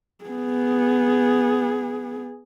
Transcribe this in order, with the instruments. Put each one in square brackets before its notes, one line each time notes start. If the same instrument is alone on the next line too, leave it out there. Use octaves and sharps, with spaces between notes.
[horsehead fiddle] B3 G#4